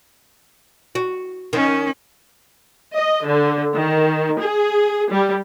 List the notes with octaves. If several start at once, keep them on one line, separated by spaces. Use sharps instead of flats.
F#4
D#3 C#4
D#5
D3
D#3
G#4
G3